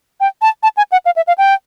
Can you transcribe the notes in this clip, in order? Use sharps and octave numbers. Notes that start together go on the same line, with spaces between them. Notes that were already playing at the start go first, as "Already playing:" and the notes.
G5
A5
A5
G#5
F#5
F5
E5
F5
G5